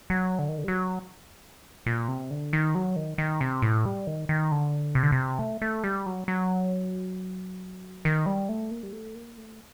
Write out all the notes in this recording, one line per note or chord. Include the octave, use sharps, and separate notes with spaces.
F#3
D3
D#3
D3
G3
F#3
A#2
C3
D3
D#3
F#3
D#3
D#3
C3
A2
G3
D#3
D#3
D3
C3
D3
C3
A3
A3
G3
F#3
F#3
D#3
G3
A3
A#3
G3
A3
A#3
A3